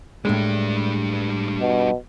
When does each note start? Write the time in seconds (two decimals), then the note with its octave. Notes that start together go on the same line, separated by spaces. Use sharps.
0.25 A2 G3 G#3 D4
1.61 B2